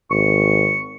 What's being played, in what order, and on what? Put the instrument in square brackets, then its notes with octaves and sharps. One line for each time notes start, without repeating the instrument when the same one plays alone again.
[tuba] G#1 [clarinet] C#6